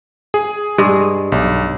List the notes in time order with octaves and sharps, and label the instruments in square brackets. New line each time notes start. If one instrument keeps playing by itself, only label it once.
[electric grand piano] G#4
[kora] G2 G#3
[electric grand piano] B1